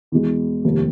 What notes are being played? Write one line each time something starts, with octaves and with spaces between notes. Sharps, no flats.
E2 B2 G#3
F1 D#2 D#3 G3